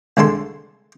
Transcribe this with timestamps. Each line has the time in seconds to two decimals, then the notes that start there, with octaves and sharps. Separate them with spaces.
0.17 C2 D3 G#3 A4 C6